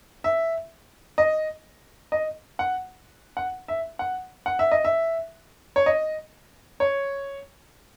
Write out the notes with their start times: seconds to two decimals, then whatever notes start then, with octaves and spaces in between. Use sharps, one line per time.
0.24 E5
1.18 D#5
2.12 D#5
2.59 F#5
3.37 F#5
3.68 E5
3.99 F#5
4.46 F#5
4.59 E5
4.72 D#5
4.84 E5
5.76 C#5
5.86 D#5
6.80 C#5